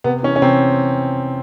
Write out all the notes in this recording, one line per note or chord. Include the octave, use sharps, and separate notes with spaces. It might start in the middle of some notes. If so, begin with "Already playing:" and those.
C3 B3
E3 C#4
C#4
C3 C4